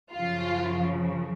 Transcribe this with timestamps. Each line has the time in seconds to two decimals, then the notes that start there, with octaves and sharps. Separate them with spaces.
0.13 F#2 C#3 F3 F4